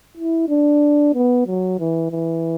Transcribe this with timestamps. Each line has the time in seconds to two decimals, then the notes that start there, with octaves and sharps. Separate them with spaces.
0.17 E4
0.49 D4
1.14 B3
1.47 F#3
1.79 E3
2.11 E3